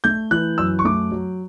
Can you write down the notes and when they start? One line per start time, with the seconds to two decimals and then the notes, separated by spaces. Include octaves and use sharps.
0.04 A3 G6
0.31 E3 F#6
0.58 F#2 E6
0.79 C#6
0.85 A3 D6
1.12 F#3